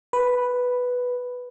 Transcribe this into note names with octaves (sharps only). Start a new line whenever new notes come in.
B4